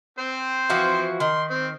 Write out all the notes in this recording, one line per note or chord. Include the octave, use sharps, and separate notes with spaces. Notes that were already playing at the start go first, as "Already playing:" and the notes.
C4 C5
E3 F3 F#4
D#3 C6
C4